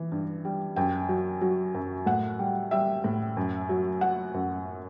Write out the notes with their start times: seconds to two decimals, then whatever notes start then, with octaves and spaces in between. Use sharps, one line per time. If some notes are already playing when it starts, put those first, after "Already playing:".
Already playing: E3
0.12 G2
0.45 G3
0.76 F#2 G5
1.09 F#3
1.41 F#3
1.75 F#2
2.06 A2 F#5
2.39 G3
2.71 G3 E5
3.04 A2
3.37 F#2
3.69 F#3
4.01 F#3 F#5
4.34 F#2